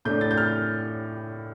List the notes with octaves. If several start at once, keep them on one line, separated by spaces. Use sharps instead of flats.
A2 A3 D4 G6
A6
G6
F6